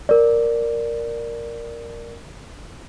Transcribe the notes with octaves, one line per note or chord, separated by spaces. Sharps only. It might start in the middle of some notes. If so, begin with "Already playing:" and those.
A#4 D5